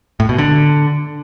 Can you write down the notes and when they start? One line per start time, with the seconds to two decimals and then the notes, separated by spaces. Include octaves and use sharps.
0.20 A2
0.29 B2
0.38 D3